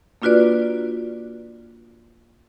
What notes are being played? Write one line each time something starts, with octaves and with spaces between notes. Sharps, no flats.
A#3 D4 F4 F#4 B4 D5